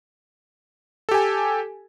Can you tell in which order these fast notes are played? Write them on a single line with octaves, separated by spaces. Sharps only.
A4 G4 G#5